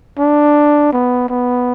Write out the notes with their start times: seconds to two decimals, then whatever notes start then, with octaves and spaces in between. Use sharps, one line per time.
0.18 D4
0.93 B3
1.29 B3